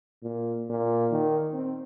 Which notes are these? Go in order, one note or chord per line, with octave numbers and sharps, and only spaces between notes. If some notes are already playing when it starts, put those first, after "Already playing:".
A#2
A#2
D#3
C4